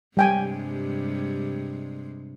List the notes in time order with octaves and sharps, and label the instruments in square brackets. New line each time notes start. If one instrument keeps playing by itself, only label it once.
[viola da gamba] G2 C3 G#3 [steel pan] G3 G5 G#5